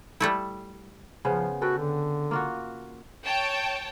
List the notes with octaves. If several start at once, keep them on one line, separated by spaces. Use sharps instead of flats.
G3 A3 E4
C#3 F3 B3 C5
F#4 A4 B4 G5
D3
A#3 F4 F#4
C#5 G5 A5